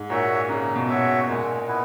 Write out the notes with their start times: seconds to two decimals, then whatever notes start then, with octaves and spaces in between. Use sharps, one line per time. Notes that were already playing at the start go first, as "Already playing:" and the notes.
Already playing: G#2
0.10 A#2 F#4 C#5 E5
0.48 C#3 D#4
0.76 B2
0.89 F#4 C#5 E5
1.28 A#2 G#3
1.67 B3 E4 B4